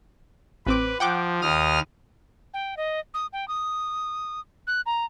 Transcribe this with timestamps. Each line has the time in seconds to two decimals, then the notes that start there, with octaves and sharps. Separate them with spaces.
0.66 A1 C4 B4 D6
1.00 F3 F#5 G5 D6
1.41 D#2 D#6 F6
2.54 G5
2.77 D#5
3.14 D#6
3.33 G5
3.48 D#6
4.67 F#6
4.86 A#5